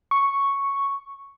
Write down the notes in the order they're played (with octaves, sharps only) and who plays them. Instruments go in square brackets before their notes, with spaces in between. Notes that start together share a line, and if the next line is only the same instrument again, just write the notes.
[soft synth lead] C#6